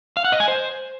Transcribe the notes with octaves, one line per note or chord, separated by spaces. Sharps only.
F5
F#5
D#5
G#5
C5